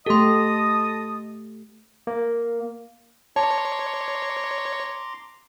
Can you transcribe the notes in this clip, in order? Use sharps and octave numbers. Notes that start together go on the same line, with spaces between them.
A3 G4 A4 D#5 A5 C6 D#6
A#3
C#5 A5 A#5 C6 D6